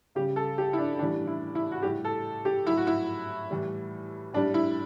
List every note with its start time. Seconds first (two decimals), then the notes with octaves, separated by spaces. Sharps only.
0.15 C#3 G4
0.19 G3
0.36 A4
0.58 G4
0.73 E4
0.78 D4
0.99 A2 E3 G3 D4
1.27 E4
1.55 E4
1.72 F#4
1.83 A2 G3 G4
2.05 A4
2.45 G4
2.67 A2 F#3 E4
2.77 F#4
2.87 E4
3.50 A2 E3 G3
4.33 A2 G3 D4
4.54 E4